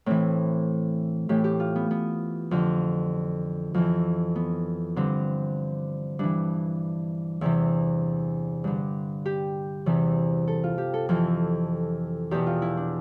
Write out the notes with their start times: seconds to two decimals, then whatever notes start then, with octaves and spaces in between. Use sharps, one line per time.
0.06 A2 E3 C4
1.29 A2 E3 G4
1.44 G4
1.60 F4
1.76 B3
1.91 B3
2.51 F2 D3
3.74 F2 E3
4.35 B3
4.96 G2 D3 C4
6.19 G2 E3 D4
7.41 E2 C3 E3 E4
8.64 G2 D3
9.25 G4
9.86 E2 C3 E3
10.48 A4
10.63 F4
10.78 G4
10.94 A4
11.09 F2 E3 A4
12.31 E2 B2 G4
12.46 F4
12.62 E4
12.77 D4